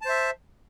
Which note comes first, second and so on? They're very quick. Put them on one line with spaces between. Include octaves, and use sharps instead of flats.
A5 C5 E5